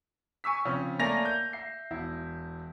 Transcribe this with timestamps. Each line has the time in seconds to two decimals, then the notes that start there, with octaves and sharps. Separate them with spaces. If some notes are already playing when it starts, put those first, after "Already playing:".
0.44 G#5 C#6 E6 B6
0.65 C#3 F3 C4 C#4
0.99 A3 A#3 D5 G#5 A#6 F7
1.25 G6
1.53 E5 C7
1.91 E1 E4